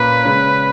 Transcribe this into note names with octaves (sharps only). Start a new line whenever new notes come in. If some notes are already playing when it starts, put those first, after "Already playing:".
Already playing: A#2 A#3 C#4 B4
C#3 G#3 C#4